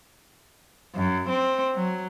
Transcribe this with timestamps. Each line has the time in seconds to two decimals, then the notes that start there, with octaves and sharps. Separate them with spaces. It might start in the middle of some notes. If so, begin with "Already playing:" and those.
0.94 F#2
1.28 C4
1.75 F#3